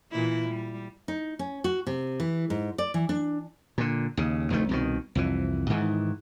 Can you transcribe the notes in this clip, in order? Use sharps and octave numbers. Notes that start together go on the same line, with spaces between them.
A#2 E3 E4
G3
D#4
C#4
F#4
C3
E3
G#2
D5
E3
D4
A#2 D3
D#2 C#3
F1 D2 D#3 A3
C2 B2 D#3
C2 F2 E3
G#2 D#3 E3